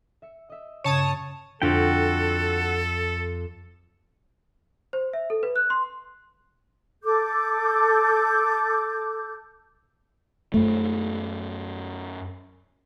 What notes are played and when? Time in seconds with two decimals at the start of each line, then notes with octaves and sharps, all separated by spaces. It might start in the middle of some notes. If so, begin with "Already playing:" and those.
0.22 E5 C#7
0.50 D#5 E5
0.84 G2 C#3 C#5 A5 D#6
1.62 F2 D3 F4 F#4 A4 G5 B6
4.93 C5
5.13 E5
5.30 A4
5.43 B4
5.56 F#6
5.70 C6
7.04 A4 D6 G6
10.54 F#2 A3